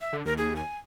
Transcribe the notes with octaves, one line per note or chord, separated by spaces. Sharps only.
E5
D3
D#2 A#4
G#4
G#5